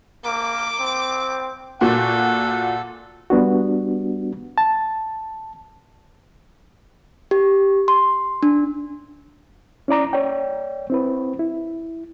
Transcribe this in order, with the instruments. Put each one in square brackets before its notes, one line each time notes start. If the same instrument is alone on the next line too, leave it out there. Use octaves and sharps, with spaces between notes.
[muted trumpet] A#3 [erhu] D6
[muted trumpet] C4
[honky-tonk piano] A#2 F#4 [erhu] A4 [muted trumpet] F#5
[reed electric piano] G3 B3 D4 F#4
A5
[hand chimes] G4
C6
D4
[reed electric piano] C#4 E4 D5 A#5 D6
C#5 D5 G5
C4 E4 B4
E4